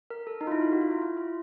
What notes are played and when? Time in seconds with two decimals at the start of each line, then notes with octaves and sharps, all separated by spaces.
0.10 A#4
0.27 A4
0.41 D#4
0.47 F4
0.52 E4
0.61 F4
0.72 F#4
0.81 F4
0.91 E4
1.02 F4
1.17 E4